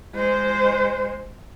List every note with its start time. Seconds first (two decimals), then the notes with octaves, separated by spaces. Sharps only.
0.15 G#3 C5